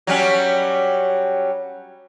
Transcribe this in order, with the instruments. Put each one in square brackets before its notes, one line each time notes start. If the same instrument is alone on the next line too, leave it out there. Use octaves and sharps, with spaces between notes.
[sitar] F#3 G3 C#4